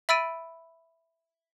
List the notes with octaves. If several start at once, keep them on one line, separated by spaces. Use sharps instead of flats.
E5 B5 E6 A6 D7 D#7